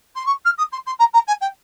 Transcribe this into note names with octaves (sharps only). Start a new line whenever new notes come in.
C6
C#6
F6
D#6
C6
C6
A#5
A#5
G#5
G5